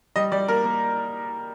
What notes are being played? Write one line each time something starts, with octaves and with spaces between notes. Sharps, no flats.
G3 D#5
G3 D5
A#3 A#4
A#3